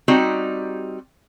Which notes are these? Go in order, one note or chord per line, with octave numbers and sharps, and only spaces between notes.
G3 C4 D#4 F#4 G4